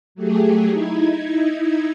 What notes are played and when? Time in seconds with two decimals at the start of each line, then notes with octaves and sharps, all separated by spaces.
0.15 F#3 A3 G4 G#4
0.70 D#4 E4 G#6